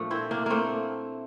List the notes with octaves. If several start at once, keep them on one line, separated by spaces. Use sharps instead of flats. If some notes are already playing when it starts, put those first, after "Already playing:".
Already playing: A#2 F3 A3 D4
C4 E4
A#3 D4
A3 A#3 C4